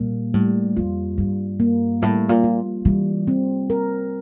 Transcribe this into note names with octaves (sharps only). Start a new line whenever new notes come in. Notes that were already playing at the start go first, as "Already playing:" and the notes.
Already playing: A#2 G3 A#3
A2 G3
F2 F4
G2 G3
A#3
A2 G3
A#2
F4
E3 G3
C4
A#4